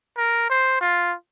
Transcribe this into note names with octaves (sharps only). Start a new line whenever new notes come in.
A#4
C5
F4